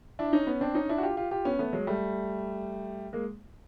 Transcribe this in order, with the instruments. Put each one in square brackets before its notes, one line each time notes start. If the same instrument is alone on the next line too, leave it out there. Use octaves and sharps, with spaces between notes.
[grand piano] D4 E4
C#4 D#4
B3 C#4
C4 D4
C#4 D#4
D4 E4
F#4
F4 G4
F4 G4
F4 G4
B3 C#4
A3 B3
F#3 G#3
G3 A3
G#3 A#3